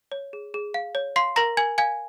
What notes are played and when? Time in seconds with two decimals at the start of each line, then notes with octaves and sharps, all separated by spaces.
0.12 C#5
0.33 G#4
0.54 G#4
0.74 F5
0.95 C#5
1.16 F5 C6 C7
1.36 A#4 A#5 A#6
1.57 A#4 G#5 G#6
1.78 F5 G#5 G#6